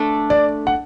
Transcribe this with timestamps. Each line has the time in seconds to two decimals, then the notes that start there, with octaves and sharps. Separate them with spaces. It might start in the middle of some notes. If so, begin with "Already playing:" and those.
Already playing: A3 D4 A4
0.30 D5
0.67 F#5